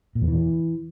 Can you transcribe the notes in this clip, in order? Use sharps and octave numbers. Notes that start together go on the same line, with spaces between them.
A#2
E2
E3